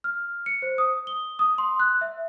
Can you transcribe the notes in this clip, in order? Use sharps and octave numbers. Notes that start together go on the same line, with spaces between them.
F6
C#7
C5
D#6
G7
D#6
C6
F#6
E5